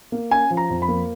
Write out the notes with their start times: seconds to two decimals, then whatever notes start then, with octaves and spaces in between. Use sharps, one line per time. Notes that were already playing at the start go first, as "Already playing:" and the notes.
0.12 A#3
0.31 C#4 G#5
0.50 F3
0.57 A#5
0.70 F2
0.82 B5
0.88 A#3